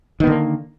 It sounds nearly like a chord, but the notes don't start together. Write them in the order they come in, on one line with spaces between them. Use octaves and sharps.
D#3 B3 D3 A#3